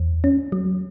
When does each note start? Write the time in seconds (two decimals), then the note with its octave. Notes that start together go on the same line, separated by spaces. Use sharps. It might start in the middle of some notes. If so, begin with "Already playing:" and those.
Already playing: E2
0.24 C#4
0.52 F#3